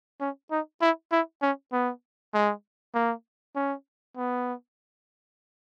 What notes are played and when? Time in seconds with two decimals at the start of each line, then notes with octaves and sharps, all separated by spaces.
0.20 C#4
0.51 D#4
0.81 E4
1.12 E4
1.42 C#4
1.72 B3
2.34 G#3
2.94 A#3
3.56 C#4
4.17 B3